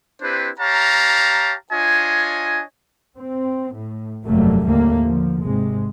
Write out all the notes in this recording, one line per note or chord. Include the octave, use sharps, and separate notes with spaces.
C4 D4 E4 G4 B4 C5
G4 C#5 F5 A5 A#5
D4 F4 C#5 D#5 G#5
C4
A2
F1 G2 F#3 G3 A3 A#3
D#2 A2 D3 G3 A3 A#3
D3 F3
G#1 C3 G#3